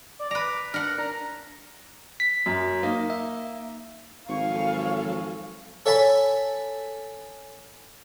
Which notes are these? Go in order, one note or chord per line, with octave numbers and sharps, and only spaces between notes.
D5
B4 A#5 D6
D4 A#4 F#5
A#5
B6
F#2
A#3 D#4
E5
G#1 F3 F#3 A4 F5 G#5 C#6
A4 C#5 E5 G#5 A5 B5